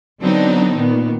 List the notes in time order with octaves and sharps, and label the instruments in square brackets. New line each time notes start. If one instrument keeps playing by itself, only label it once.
[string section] D3 F#3 B3 C4 D4 D#4
A#2 D#3 B3